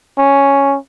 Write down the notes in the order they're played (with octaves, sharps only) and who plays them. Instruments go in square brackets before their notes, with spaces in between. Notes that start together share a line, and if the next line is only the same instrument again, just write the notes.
[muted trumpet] C#4